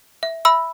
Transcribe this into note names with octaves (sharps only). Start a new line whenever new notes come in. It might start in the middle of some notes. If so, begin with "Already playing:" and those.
E5
E5 B5 E6